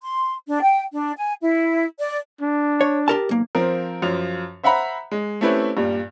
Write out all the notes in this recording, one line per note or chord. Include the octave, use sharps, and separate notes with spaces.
C6
D4
G5
D4
G#5
E4
D5
D4
C#5
G4 A#4 A5
B1 A#3
F3 C4 A#4
F#2 F3 F7
C5 E5 F#5 A#5 B5
G#3
A3 C4 C#4 E4 G4 B4
G2 A#2 G3